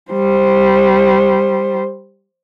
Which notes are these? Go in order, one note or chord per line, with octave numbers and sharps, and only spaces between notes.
G3 C5